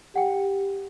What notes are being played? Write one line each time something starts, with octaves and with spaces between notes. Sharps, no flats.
G4 F#5 G5